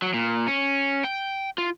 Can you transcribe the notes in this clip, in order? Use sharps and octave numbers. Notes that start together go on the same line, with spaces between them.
F#3
A#2
C#4
G5
F4